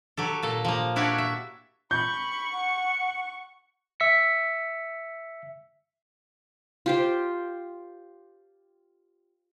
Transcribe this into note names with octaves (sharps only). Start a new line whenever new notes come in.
F#3 G4 A4
A#2 A4
F3 A#3
D4 E4 F#4 G4 C#5 D5
E5
B5 C#6 G6
F#5
E5 B6 C#7
F4 G4 C5